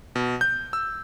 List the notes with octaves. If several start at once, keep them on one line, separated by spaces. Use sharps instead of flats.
B2
G6
E6